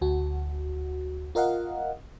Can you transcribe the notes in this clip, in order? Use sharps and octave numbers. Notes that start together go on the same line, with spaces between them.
D2 F#4
F4 A#4 D#5 F5 F#5